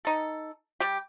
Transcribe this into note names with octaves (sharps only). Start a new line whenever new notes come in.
D#4 A4
G3 G4